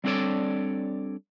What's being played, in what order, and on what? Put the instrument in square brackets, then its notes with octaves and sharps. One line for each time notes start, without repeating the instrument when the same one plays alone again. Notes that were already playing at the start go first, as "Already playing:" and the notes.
[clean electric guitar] G3 C4 D4 A4 C#5 D5